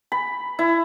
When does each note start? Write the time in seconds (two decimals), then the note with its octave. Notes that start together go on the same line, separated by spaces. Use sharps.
0.12 B5
0.59 E4